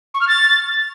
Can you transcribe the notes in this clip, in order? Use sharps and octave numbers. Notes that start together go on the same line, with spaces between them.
C#6
F6
A6